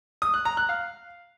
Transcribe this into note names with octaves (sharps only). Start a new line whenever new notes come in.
D#6
F#6
A#5
F#6
F5